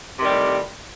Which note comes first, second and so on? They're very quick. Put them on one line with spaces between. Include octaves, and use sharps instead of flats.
C3 D#3 G3 A2